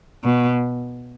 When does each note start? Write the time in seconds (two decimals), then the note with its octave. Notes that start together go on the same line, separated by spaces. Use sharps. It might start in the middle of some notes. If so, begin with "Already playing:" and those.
0.24 B2